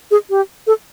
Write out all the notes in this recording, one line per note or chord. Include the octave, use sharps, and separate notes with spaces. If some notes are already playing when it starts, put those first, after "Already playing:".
G#4
G4
A4